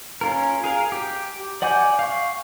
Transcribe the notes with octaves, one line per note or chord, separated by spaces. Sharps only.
C#4 F4 A#4
G#4 A#4 F5
G4
D5 F#5 G#5 D6 G6
F5 C#6